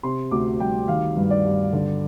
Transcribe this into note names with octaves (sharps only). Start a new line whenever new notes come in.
C3 C6
D2 D6
G3 G5
D#3 F5
G2
D5
G2
D3